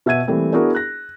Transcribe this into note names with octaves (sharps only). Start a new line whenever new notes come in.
B2 E5 F#5 G#6 D#7
E3 G3 A3 A#3 C4
B3 D4 E4 F#4 G#4 A#4
F#6 A#6